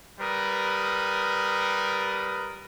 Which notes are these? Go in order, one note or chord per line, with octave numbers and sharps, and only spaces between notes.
G3 A#4 B4 D#6